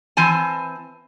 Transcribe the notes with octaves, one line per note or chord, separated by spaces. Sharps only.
E3 C4 G#5 A5